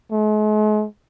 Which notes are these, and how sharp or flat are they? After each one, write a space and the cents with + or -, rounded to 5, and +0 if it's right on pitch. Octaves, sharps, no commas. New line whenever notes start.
G#3 +45